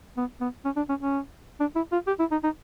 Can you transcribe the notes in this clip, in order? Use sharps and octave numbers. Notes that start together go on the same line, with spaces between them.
B3
B3
C#4
D4
C#4
C#4
D4
E4
F4
G4
E4
D#4
D#4